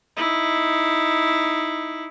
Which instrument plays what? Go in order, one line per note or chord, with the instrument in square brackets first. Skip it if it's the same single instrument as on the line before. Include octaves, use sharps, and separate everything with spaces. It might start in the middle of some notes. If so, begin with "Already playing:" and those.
[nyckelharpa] D#4 E4